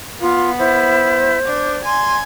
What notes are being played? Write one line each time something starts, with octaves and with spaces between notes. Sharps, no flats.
B3 F4 F5
E4 C5
D4 D6
G#5 C6